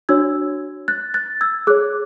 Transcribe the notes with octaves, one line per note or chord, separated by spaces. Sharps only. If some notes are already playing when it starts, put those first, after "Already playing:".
D4 F#4 C#5 E6 G#6
F#6 A6
F#6 A6
E6 G#6
G#4 C#5 D6 F#6